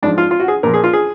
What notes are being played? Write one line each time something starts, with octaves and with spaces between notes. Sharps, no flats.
G#2 F3 D4
F4
F4
F#4
G#4
A#2 F3 A#4
G#4
F4
G#4